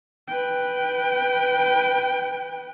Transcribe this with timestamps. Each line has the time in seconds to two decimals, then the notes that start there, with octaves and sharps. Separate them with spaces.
0.28 B4 G5